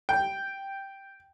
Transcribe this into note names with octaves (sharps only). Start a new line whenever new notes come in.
G5